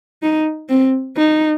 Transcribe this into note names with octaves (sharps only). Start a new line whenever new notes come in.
D#4
C4
D#4